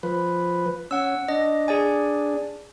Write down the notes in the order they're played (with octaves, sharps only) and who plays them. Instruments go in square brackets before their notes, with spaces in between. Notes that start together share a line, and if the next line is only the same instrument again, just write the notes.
[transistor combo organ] F3 B4
[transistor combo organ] C#4 [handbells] F#5 E6
[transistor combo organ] D4 [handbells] D#5
[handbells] G#4 D5 G#5